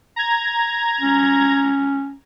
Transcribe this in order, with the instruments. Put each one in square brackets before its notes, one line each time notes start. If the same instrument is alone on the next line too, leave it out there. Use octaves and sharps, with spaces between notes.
[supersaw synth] A#5 G#6
[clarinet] C#4